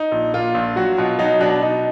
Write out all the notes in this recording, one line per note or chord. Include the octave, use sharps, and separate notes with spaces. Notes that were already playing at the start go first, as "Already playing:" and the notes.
Already playing: D#4
A#1
A#2 F4
A#1
F#3 F#4
B2 F4
F#3 D#4
B2 D4
B2 D#4